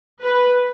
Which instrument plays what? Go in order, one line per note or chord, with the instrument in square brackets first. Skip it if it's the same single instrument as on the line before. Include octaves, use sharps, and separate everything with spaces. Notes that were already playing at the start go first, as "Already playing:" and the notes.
[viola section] B4